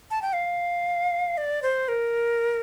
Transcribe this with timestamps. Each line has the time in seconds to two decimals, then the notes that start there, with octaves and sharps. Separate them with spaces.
0.11 A5
0.22 G5
0.33 F5
1.37 D5
1.62 C5
1.88 A#4